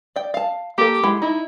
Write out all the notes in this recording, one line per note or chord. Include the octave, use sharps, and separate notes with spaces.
D5 G5
F5 A5
A#3 G4 A4
G#3 E4 F#5
D#4 E4